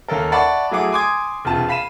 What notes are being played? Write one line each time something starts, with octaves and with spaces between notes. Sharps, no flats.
D#2 C#4 A4 A#4
D5 E5 F#5 A5 B5 C#6
F#3 A3 E4 G#4 F#5 D6
G#5 C6 D6 D#6 G#6
E1 C3 F4 A5
F5 B5 B6 D#7 E7